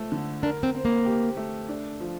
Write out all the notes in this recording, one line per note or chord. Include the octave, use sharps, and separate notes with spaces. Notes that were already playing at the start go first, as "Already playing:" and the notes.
Already playing: F3 A3
D3
D4 A#4
C4
C4
A#3
G4
A3
D4
F3